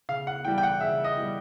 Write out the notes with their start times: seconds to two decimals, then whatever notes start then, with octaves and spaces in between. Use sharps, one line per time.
0.09 C#3 F5
0.27 F#5
0.45 E3 G3 G5
0.58 G5
0.63 F#5
0.80 C#3 E5
1.04 D#5
1.17 E3 G3